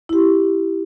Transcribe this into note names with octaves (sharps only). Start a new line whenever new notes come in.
E4 G4